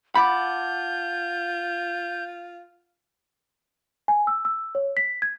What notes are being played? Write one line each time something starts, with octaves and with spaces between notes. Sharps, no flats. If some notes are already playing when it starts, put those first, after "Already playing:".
F4 F#5 A5 B5 D6 G6
G#5
E6
E6
C#5
B6
G#6